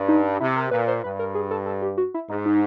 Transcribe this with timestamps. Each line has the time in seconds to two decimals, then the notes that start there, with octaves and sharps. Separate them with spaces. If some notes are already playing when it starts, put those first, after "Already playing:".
Already playing: G2
0.08 D#4
0.40 C3 E4
0.56 A#4
0.71 A#2 B4
0.88 C5
1.04 G2 B4
1.19 A#4
1.35 G#4
1.51 A4
1.66 A4
1.82 G4
1.98 F#4
2.14 E4
2.29 G#2 D#4
2.46 D#4